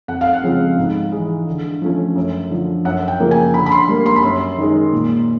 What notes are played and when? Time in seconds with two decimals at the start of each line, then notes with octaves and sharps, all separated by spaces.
0.08 F2 F#5
0.21 F5
0.33 F#5
0.43 C#3 F3 G#3 C4
0.77 G#2
1.12 E3 G#3
1.46 D3
1.82 F3 A3 C#4
2.15 F#2
2.50 D3 F3
2.85 F#2 F#5
3.08 G5
3.20 C#3 F3 A#3
3.31 G#5
3.54 D3 B5
3.66 B5
3.72 C6
3.88 G3 A#3
4.06 C6
4.16 B5
4.23 F#2 C6
4.58 D#3 G#3
4.92 A#2